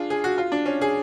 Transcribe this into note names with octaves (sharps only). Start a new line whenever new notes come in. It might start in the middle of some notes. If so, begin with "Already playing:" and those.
Already playing: D4 F4 G#4
G#4
F#4
F4
D4
C#4
G#4